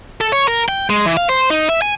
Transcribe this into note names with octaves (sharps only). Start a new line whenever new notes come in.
A4
C#5
A#4
G5
G#3
E3
F5
C5
D#4
E5
G#5